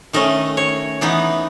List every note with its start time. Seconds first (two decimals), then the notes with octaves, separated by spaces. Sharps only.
0.13 D#3 A3 C#4 D#5
0.57 C#5
1.01 E3 B3 D#4